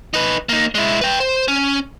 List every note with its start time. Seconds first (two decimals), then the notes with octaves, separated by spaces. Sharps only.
0.14 D#4 B4
0.49 A#3 D#4
0.75 G#3 E4
1.01 B4 G5
1.20 C5
1.48 C#4